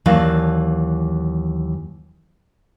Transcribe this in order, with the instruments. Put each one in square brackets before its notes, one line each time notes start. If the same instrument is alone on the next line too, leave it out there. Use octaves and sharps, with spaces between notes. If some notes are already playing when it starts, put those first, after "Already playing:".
[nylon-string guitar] D#2 E3 F#3 D5 F5 A5